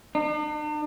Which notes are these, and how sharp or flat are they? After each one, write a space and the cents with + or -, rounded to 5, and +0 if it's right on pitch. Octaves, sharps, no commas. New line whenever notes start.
D4 +45